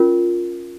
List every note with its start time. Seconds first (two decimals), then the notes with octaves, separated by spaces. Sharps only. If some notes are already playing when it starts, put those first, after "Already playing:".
Already playing: C#4 F4 A#4